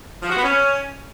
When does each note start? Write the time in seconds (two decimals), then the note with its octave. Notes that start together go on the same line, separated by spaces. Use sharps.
0.22 F3
0.29 F#4
0.37 B3
0.44 C#4